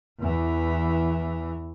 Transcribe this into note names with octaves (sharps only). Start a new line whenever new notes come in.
E2 E3